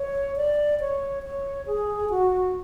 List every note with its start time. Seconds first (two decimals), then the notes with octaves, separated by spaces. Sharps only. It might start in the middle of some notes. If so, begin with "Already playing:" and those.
Already playing: C#5
0.36 D5
0.80 C#5
1.23 C#5
1.67 G#4
2.10 F#4